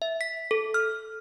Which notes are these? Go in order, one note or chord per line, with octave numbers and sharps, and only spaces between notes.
E5
B6
A4
F6